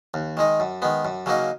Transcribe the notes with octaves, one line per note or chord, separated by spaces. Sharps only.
D#2
D#3 G#3 D#4
F#2
D#3 G#3 B3
F#2
C#3 F#3 A#3 D#4